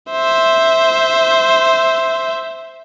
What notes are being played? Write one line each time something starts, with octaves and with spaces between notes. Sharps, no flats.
C5 E5